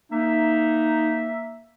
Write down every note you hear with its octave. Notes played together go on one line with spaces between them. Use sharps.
A#3 D#4 E5